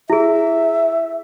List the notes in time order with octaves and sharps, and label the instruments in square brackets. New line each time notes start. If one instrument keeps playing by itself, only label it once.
[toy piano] E4 G#4 [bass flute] E5